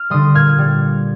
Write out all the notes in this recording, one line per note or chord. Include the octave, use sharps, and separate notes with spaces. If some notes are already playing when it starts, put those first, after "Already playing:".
Already playing: F6
D3 G3 C6 D#6
A#2 F6 G#6
G3